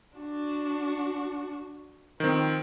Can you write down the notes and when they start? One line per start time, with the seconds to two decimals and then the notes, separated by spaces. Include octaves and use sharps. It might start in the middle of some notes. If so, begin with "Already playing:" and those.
0.17 D4 F#4
2.20 D#3 F3 C4